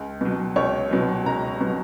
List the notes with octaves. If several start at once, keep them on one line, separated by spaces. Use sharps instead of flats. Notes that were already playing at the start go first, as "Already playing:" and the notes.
Already playing: C#2
B2 F#3
C#2 C#5
B2 F#3
C#2 A#5
B2 F#3